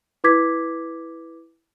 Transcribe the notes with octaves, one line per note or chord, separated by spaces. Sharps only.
E4 B4 D6 G#6 B6